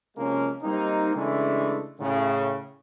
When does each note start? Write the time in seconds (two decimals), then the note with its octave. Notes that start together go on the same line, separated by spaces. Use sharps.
0.16 C3 F3 G#3 A#3 C#4
0.62 G3 A#3 C4 D#4
1.16 C#3 E3 G#3 A3 D4 E4
2.00 A2 C#3